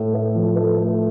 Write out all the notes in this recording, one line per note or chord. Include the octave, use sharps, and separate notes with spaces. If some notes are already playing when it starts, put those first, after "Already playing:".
Already playing: A2 A3
A3
F3
A3
A3